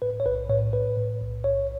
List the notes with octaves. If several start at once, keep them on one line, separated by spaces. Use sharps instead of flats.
A2 B4
C#5
B1 B4
A2 C#5
A2 B4
A2
B1
B1 C#5